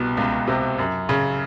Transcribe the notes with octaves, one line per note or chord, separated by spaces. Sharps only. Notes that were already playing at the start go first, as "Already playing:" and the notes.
Already playing: C2 B2
C#2
C3
F#2
C#3